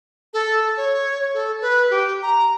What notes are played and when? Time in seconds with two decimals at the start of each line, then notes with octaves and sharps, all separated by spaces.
0.34 A4
0.77 C#5
1.34 A4
1.61 B4
1.90 G4
2.23 A#5